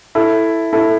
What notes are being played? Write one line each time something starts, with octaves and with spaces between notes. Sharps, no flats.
E4 A4
E4 A4